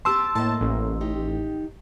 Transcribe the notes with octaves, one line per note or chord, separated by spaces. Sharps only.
B3 G4 A5 C6 E6
A2 A#3 D#5 A5
A1
D#3 D#4 G4